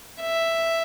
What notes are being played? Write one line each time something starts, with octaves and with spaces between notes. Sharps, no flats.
E5